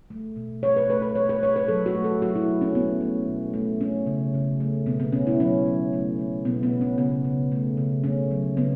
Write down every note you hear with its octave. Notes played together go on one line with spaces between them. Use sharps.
A3
B2
A3 C#5
B4
A3 B4
B4
A3 C#5
B4
A3 C#5
B4
F#3 A4
F#4
A3
A4
F#3 F#4
E4
F#3
C#4
A3 B3
A3
B2
A3
A3 C#4
C#3
C#3
A3
B2 B3
B3
B2 C#4
E4
F#3 C#4
F#3
A3
A3
B2 B3
B3
B2
C#4
C#3 B3
C#3
A3
C#3
A3 C#4
F#3
C#3 B3